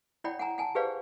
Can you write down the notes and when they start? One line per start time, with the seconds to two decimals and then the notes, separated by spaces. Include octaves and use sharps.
0.24 E4 C#5 D5 F#5 G5 B5
0.39 F#5 G#5 A#5
0.58 F#5 G#5 A5
0.75 G4 G#4 B4 C5 D5 F5